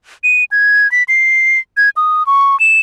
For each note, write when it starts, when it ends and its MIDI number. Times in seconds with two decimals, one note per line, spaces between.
0.24 0.44 99
0.52 0.90 92
0.92 1.03 95
1.08 1.59 96
1.77 1.89 92
1.97 2.23 87
2.27 2.59 85
2.60 2.81 100